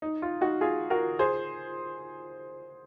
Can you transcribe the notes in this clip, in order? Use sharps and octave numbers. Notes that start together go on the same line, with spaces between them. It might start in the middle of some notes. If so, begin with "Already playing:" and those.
D#4
F4
D#4 F#4
F4 G#4
F#4 A#4
G#4 C5